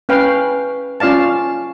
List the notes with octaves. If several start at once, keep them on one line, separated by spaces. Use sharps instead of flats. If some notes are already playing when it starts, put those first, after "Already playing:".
C#4 B4 F5 G5
C#4 F4 D5 F5 A5